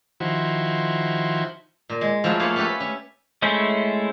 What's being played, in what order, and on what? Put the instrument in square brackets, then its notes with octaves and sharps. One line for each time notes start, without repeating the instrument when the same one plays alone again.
[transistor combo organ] D#3 F3 E4 F#4 C5
[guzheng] A#2
G#3
F3 F#3 A3 E4 F#4 G#4
A3 A#3 G#4 C5 C#5
A3 C#4 G4 A4 B4
C#4
[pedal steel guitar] G#3 A3 C#4 E4 C5